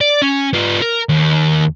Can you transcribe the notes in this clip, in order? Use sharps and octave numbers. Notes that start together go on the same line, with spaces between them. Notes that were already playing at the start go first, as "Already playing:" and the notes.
D5
C#4
B3 F4
A#4
D#2